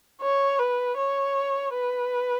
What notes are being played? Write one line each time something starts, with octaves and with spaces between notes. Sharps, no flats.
C#5
B4
C#5
B4